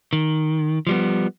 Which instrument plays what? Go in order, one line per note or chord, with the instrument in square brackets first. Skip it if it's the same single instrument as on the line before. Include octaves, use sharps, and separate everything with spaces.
[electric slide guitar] D#3
F3 G3 B3